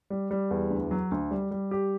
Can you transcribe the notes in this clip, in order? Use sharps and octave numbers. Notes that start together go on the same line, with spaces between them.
G3
G3
E2
D2
F#3
D2
G3
G3
G4